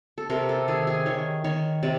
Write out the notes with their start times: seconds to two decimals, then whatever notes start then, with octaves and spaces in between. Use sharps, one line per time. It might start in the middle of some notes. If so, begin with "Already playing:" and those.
0.18 A4
0.30 C3 A#4
0.49 A4
0.68 D#3 G#4
0.87 G#4
1.06 D#3 C#5
1.44 D#3 C#5
1.83 C3 D5